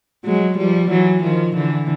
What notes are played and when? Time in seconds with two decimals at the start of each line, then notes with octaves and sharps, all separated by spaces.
0.25 F#3 G#3
0.57 F3 G3
0.90 E3 F#3
1.22 D#3 F3
1.55 D3 E3